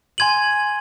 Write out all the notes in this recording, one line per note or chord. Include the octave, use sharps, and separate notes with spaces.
G#5 C6 G#6 D#7 F#7